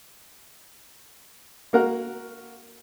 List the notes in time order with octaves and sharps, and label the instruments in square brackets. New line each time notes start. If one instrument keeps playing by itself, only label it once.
[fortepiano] A#3 F#4 A#4 F5 F#5